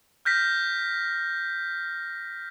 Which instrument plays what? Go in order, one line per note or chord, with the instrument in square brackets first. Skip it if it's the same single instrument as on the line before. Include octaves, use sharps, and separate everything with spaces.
[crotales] F6 G6 A#6 B6